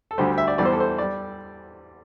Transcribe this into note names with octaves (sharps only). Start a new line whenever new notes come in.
A4
D2 D3 G3 C5
E5
D5
E2 E3 G3 D5
C5
A4
C5
G3 D5